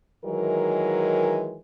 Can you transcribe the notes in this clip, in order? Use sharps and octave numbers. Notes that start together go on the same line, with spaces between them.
D#3 E3 F#3 G#3 A#4